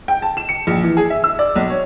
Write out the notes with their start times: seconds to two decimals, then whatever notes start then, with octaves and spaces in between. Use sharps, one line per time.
0.08 G5
0.22 A5
0.37 E7
0.49 C#7
0.67 A#1
0.83 E3
0.97 G#4
1.10 E5
1.24 E6
1.39 D5
1.56 B1
1.70 C#5